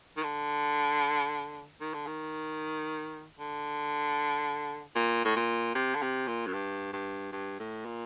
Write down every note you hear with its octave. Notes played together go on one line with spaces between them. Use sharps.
D#3
D3
D#3
D3
D#3
D3
A#2
A2
A#2
C3
D3
C3
A#2
F#2
G2
G2
G2
A2
A#2